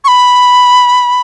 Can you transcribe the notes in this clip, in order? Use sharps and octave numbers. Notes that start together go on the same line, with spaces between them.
C#6
B5